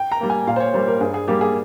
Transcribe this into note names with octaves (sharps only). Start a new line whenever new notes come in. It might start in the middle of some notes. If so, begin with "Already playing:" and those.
Already playing: G5
A#5
G3 A#3
G#5
A#2 F5
C5
C#5
G3 A#3 C5
A#4
G2 G#4
G#4
G3 A#3 G4
G#4